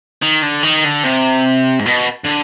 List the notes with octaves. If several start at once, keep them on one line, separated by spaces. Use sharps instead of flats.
D#3
D3
D#3
D3
C3
G#2
B2
D3